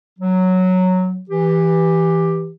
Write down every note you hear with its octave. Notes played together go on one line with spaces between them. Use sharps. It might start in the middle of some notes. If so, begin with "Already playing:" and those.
F#3
E3 G4